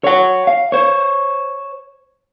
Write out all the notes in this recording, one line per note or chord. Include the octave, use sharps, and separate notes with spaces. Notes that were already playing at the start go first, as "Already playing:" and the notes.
C#5 F#5
F5
C5 C#5